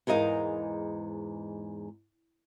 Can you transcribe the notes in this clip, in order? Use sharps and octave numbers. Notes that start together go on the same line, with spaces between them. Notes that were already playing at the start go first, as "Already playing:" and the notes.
E2 G#2 A#4 D#5 F5